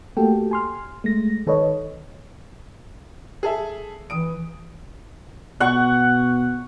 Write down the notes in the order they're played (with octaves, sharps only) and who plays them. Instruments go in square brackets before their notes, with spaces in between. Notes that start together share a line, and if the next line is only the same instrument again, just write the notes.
[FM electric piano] A3 A#3 F#4 G4 A4 G5
G#5 C6 F6
G#3 A3 A#6
D#3 A4 B4 C#5 D#5
[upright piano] G#4 A4 E5
[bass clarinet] E3 [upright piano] D#6 D7
[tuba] B2 [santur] F#5 C#6